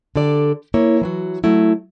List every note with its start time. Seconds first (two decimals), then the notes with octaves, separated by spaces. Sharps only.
0.16 D3 G4 A4 D5
0.74 A#3 E4 C#5
1.01 E3 F#3 F#4
1.44 F#3 A3 E4